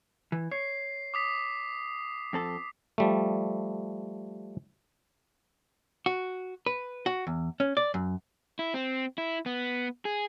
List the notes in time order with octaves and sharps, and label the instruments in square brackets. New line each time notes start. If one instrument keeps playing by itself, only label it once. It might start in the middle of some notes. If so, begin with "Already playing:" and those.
[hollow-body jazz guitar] E3
[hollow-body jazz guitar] C#5 [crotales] C7
[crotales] D6 D#6 B6
[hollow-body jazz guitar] F2 C4 A4
[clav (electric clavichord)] F3 G3 A3
[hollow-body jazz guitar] F#4
B4
F#4
E2
C#4
D5
F#2
[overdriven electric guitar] E4
C4
E4
B3
G#4